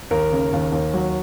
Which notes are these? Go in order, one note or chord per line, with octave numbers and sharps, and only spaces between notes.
D#2 A#4
C#3
D#2
D#2
F#3